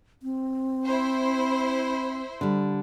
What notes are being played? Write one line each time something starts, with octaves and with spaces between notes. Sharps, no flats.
C4
E4 C5
D3 G3